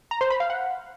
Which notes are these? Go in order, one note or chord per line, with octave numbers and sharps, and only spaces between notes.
A#5
C5
B5
F5
F#5